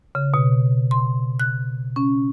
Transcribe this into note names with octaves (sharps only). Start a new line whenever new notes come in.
C#3
B2
C6
F#6
C#4